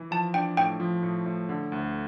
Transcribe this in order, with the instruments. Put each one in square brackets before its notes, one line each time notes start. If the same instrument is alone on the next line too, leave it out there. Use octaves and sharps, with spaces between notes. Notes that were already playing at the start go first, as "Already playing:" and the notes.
Already playing: [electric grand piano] E3
[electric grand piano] F3 [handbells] A5
[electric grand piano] D4 [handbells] G5
[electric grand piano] A2 [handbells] G5
[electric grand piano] F3
A2
A2
D3
D2